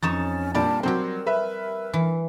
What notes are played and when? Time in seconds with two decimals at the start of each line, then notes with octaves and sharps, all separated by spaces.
0.03 F2 C#4 D#4 C#5 A6 E7
0.55 A#2 G3 D4 D5 A5
0.83 F#3 C4 G4 A#4 C5
1.26 B4 E5
1.94 E3